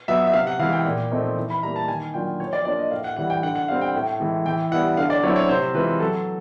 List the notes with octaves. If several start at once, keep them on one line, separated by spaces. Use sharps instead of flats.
F#3 B3 E5
E5
C3 F5
F#5
E3 G#3 F5
G5
A#2
F3 A3 C4 D#4
E3
B5
G3 A#3 A#5
A5
D#3 G#5
F#3 A#3 D4 F4 G5
F3 C#5
D5
A#3 D4 F4 D5
D#5
A2 F5
F#5
E3 G3 F#5
G5
D3 F#5
F#5
G3 C4 F5
G5
A2
E3 G#3
E3 G5
G3 B3 E4 F#5
D3 F5
D5
F#3 A3 C4 E4 C#5
C#5
C3 C5
E3 G#3 C4 F4 B4
F#3 A4